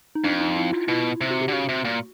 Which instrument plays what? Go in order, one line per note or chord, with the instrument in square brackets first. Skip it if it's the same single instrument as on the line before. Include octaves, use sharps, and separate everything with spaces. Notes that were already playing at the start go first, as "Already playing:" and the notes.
[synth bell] D#4
[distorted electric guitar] F2 [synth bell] D4
[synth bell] D#4
E4
F4
[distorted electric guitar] B2 [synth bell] E4
[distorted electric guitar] C3
[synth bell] F#4
G4
[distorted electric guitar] D3
[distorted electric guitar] C#3 [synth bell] F#4
[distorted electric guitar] C3
A#2